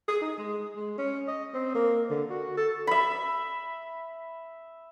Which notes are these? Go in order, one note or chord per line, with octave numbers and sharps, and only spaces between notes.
G#4
D#4
G#3
G#3
C#4
D#5
C4
A#3
D3
F#4
A4
E5 B5